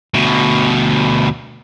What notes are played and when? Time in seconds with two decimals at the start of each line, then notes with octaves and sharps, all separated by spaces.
0.14 D2 B2